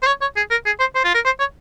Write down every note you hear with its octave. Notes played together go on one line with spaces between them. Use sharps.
C5
C#5
C#5
G#4
A#4
G#4
C5
C5
F4
A#4
C5
C#5